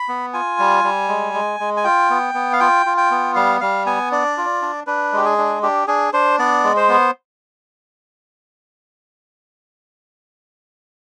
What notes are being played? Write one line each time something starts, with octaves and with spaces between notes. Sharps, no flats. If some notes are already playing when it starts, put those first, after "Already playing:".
Already playing: B5
B3
F4 G#5
G3
G3
G#3
G#3
G#3
G#5
F4 G5
B3
B3
F5
F4 G5
F4
G5
B3
G3 F5
G3 F5
B3 G#5
D4 D5
F4
D4
D4 B4
G#3 G4
G#4
D4
D4 G4
D4 G#4
D4 C5
B3 D5
G#3
C5
B3